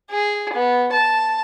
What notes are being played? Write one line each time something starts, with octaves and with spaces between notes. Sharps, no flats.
G#4
B3
A5